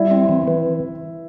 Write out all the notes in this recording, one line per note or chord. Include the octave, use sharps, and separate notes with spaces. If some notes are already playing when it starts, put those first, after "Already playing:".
Already playing: G3 E4
C4
E3
E3